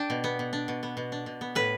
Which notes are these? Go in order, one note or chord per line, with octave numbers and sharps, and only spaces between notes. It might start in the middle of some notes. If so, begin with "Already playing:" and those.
Already playing: D4 G5
B2
B3
B2
D4
B2
B3
B2
D4
B2
B3
A2 B4